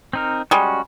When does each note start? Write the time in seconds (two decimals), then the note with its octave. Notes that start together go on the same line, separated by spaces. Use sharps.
0.13 C4 D#4 A#4
0.51 G3 G#3 C#4 F#4